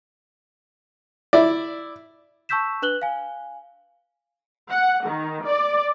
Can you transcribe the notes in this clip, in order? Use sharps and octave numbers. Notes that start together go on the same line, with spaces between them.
E4 D5
A5 C#6 E6 G6 B6 E7
D4 B4 F#6 F#7 G7
F5 G#5
F#5
D#3
D5